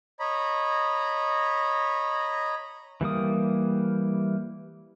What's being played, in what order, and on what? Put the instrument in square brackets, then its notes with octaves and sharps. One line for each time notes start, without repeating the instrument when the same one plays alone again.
[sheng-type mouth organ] C#5 D#5 A#5 B5
[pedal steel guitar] E3 G3 A#3 D#6